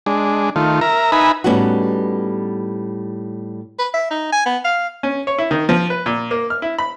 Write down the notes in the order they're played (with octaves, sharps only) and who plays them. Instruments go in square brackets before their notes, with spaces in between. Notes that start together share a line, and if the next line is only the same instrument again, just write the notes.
[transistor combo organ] G#3 D4
D#3 A3 F4
A#4 E5 A#5
D#4 B4 E5 G#5 A#5 B5
[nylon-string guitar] A2 G3 B3 C#4 D#4 F#4
[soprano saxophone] B4
E5
D#4
G#5
B3
F5
[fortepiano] C#4
C#5
E4
D#3
F3
B4
A#2
A#3
F6
E4
B5